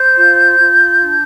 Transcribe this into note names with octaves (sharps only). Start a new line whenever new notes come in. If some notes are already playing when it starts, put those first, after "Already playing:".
Already playing: C5 G6
F4
F4
D4